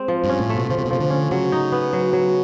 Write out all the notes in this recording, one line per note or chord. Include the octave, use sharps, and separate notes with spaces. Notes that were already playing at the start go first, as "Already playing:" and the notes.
Already playing: G#3 C4
F3
G2
C#4
A2
A3
B2
C#3 F3
C3
B2
C3 F3
D3
C#4
C#3 F#3
D#4
B3
F#3
F#3